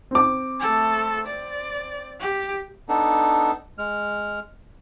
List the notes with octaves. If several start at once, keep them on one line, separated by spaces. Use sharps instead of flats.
C4 D6
A3 A4
D5
G4
B3 D4 D#4 A4
G#3 F6